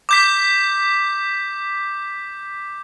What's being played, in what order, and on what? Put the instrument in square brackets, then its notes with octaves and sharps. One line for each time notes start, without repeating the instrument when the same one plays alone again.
[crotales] D6 G6 B6